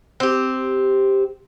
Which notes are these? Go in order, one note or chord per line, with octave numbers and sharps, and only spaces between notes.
C4 G4